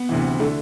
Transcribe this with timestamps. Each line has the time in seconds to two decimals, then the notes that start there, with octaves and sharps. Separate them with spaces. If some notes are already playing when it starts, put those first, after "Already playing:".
Already playing: B3
0.09 D2 C3 E3
0.40 D3 A3